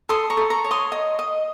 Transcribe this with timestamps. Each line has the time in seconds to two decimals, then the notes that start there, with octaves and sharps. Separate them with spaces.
0.09 A4 C6 D#6
0.30 A#5 C#6
0.37 A4
0.50 A#5 C#6
0.65 C#5
0.71 C6 D#6
0.92 D#5
1.19 D#5